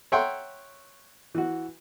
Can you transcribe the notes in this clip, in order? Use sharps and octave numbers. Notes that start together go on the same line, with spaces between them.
C#5 E5 F#5 G5 A#5 C6
E3 F#4